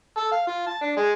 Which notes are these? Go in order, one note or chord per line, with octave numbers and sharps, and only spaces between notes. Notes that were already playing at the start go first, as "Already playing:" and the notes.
A4
F5
F4
A5
D4
G#3